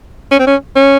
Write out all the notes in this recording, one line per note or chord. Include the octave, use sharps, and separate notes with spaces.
C#4
C4
C#4
C#4